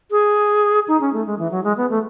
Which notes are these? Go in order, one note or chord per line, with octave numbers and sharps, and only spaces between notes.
G#4
D#4
C#4
A3
G#3
E3
F#3
G#3
B3
A3